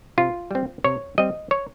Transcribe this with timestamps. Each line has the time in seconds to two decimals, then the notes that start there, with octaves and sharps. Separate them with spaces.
0.18 C3 F4
0.51 G3 C4
0.84 C3 C#5
1.18 G3 C4 D#5
1.51 C#5